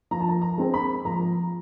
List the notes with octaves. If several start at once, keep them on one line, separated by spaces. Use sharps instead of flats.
F3 A#5
A5
A#5
A#5
G#3 C4
B5
F3 A#5